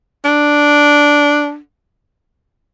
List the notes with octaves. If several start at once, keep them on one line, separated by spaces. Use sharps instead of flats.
D4